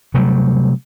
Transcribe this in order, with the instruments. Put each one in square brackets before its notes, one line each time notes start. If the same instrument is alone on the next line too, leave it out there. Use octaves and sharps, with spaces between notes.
[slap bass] C3 F#3 G3 A3